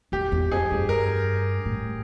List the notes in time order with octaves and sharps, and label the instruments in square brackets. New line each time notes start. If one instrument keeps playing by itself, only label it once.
[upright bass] F2 [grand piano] G4
[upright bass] E2
[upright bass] F2 [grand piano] G#4
[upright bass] G2
[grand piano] A#4
[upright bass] A2